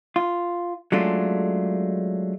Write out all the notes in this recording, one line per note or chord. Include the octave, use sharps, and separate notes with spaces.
F4
F#3 G#3 A3 C#4 D4 F4